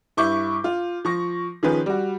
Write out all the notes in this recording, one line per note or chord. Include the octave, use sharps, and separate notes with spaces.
G2 E4 C#6 D6 G6
F4
F3 C#6 A#6
D#3 F3 C#4 G#4 B4
G3 F#4